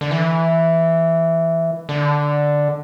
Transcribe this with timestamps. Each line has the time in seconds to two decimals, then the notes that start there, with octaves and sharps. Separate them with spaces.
0.01 D3
0.11 E3
1.89 D3